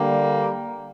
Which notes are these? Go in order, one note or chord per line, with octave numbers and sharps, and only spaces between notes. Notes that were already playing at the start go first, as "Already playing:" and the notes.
Already playing: D3 G3 A#3